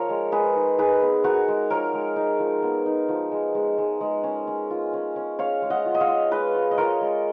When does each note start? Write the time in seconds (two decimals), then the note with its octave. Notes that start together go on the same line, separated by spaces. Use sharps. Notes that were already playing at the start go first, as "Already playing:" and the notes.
Already playing: F3 A#4 C#5
0.09 G#3
0.32 G#3 G#4 B4
0.55 D#4
0.78 D#4 G#4 B4
1.02 B3
1.24 D#4 F#4 A#4
1.48 G#3
1.70 F3 A#4 C#5
1.93 G#3
2.16 D#4
2.39 F3
2.63 B3
2.86 D#4
3.09 F3
3.32 G#3
3.55 G#3
3.78 G#3
4.01 G#3
4.24 C#4
4.47 C#4
4.70 F4
4.93 C#4
5.16 C#4
5.38 C#4 C#5 F5
5.62 G#3
5.70 D#5 F#5
5.86 F4
5.95 D#5
6.01 C#5 F5
6.08 F4
6.31 G#3 B4 D#5
6.54 F4
6.71 D#5
6.78 F4 A#4 C#5
7.01 G#3